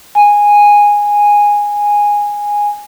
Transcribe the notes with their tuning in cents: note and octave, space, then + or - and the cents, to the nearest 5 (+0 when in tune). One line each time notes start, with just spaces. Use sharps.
G#5 -10